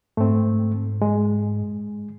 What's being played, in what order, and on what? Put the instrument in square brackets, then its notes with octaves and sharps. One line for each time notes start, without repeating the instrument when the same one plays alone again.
[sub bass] G#2 [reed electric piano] A3 C4
[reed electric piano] G#3